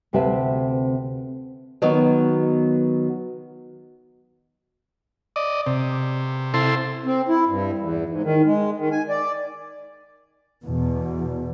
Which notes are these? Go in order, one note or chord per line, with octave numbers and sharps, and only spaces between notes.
D2 C3 C4 B4 E5 A5
D#3 F#3 B3
D5 D#5
C3
E4 A4 C5 C6
C4
E4
G2
E2
G#2
D#3
G#3
D#3
G#5
D5
E2 B2